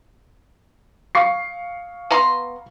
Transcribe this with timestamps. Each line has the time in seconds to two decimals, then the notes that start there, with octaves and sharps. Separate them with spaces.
1.15 F5 C#6 C7
2.11 B3 A#5 C6